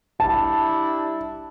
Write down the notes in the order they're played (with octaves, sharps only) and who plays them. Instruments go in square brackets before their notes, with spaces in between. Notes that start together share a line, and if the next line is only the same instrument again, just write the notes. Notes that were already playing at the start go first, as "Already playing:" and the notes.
[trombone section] G3 D4 E4 [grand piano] A5